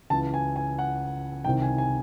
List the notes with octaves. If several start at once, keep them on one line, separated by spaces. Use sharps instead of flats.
C#2 C#3 E3 A5
G#5
G#5
F#5
C2 C3 D#3 G5
G#5
G#5